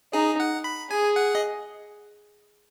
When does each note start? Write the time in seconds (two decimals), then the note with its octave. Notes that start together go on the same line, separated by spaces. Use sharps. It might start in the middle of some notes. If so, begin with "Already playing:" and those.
0.13 D#4 G#4
0.40 F#5
0.64 B5
0.90 G#4 G#5
1.16 F#5
1.35 D#5